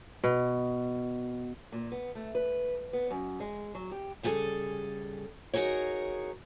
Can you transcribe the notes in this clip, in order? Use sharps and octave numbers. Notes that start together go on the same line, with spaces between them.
B2
A#2
B3
A3
B4
B3
F#2
G#3
F#3
G4
C#3 G3 G#4 A4 G#5
D#4 F#4 G#4 A#4 C#5